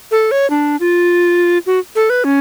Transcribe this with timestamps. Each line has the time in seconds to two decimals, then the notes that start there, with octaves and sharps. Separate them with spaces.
0.11 A4
0.31 C#5
0.50 D4
0.80 F4
1.66 F#4
1.96 A4
2.10 B4
2.24 C#4